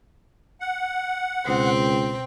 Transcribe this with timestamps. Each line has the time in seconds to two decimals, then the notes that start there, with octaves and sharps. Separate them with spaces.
0.61 F#5
1.47 C#2 B2 C4 G5